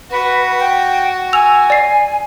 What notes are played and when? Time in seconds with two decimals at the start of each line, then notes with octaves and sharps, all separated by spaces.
0.11 F#4 B4
0.59 G5
1.33 G#5 E6 F7
1.70 D5 C7